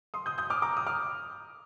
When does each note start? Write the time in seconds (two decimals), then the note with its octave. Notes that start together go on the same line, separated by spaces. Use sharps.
0.14 C6 D#6
0.26 D#6 G6
0.38 D#6 G6
0.50 D6 F6
0.62 A#5 D6
0.77 D#6
0.87 D6 F6